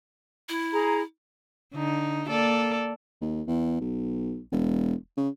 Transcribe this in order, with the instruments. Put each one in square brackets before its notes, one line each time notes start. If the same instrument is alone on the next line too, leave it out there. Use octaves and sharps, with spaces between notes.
[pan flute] E4
[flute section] G#4 A#5
[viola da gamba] D3 D#4
A#3 A4 D5
[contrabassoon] D#2
E2
B1
E1
C#3